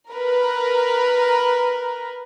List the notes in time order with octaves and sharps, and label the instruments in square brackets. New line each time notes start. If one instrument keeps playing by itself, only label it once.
[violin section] A#4 B4